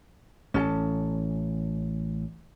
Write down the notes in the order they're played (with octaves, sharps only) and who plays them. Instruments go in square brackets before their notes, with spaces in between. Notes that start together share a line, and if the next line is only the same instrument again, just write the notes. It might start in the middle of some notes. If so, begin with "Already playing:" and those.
[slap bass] A1 [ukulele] C#4 A4 A5